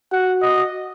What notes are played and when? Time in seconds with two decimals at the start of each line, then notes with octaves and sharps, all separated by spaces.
0.12 F#4 F#5
0.42 D#5